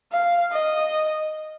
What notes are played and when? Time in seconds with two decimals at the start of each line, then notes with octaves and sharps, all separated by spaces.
0.12 F5
0.52 D#5